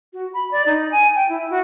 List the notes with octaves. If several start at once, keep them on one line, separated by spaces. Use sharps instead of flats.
F#4
B5
D5
D#4
G#5
G5
E4
F#4